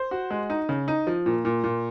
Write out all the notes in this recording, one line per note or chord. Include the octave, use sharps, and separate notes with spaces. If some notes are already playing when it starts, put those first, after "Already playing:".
Already playing: C5
F#4
G#3
D#4
C#3
D#4
F3
A#2
A#2
A#2